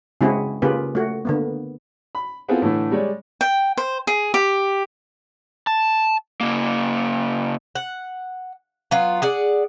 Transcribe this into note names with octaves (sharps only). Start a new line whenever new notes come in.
C#3 G#3 C4 E4 F#4 G#4
C#3 A#3 F4 G4 G#4 B4
A3 F#4
D3 A#3 B3
B5
B3 C4 E4 F4 G#4 A4
A2 D3 E3 A3
G3 G#3 C#5 D5
G5
C5
G#4
G4
A5
C#3 A#3
F#5
F#3 B3 F4
G#4 D5 F#5